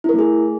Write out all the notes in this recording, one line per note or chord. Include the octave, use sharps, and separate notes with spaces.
A3 E4 G#4 A#4